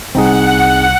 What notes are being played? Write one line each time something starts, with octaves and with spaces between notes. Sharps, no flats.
C2 C4 D#4 G#4 F#5